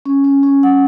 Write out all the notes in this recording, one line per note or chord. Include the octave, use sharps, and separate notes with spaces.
C#4
C#4
C#4
F#5